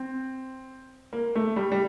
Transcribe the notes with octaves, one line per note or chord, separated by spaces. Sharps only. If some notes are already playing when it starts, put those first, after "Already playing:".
Already playing: C4
A#3
A3
G3
G3